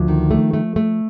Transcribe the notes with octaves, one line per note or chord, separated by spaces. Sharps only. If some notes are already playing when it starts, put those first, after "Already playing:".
Already playing: D2 F3
D#3
A3
A3
A3